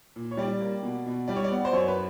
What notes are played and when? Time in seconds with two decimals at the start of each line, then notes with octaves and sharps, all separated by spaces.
0.16 A#2
0.31 C#5
0.37 G3 D5
0.61 A#3
0.83 B2
1.06 B2
1.28 G3 D5
1.36 C#5
1.44 D5
1.50 B3
1.65 C5
1.73 F#2 C#5
1.88 B4